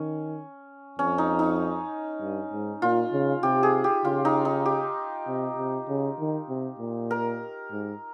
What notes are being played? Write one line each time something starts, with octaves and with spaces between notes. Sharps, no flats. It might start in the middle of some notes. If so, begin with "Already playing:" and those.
Already playing: D#3 C#4
F2 C#4
D#4
D#4
G2
G#2
A#2 F4
C#3
C3 G4
G#4
G4
C#3 F4
D#4
D#4
G4
C3
C3
C#3
D#3
C3
A#2
A#4
G#2